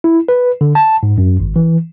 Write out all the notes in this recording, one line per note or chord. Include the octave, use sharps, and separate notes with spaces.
E4
B4
D3
A5
G#2
F#2
G#1
E3